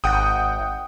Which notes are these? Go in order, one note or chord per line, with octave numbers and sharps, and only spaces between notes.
G#1 F#5 G5 D#6